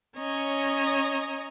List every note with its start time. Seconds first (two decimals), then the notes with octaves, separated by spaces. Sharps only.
0.18 C#4 C#5 D#5 A#5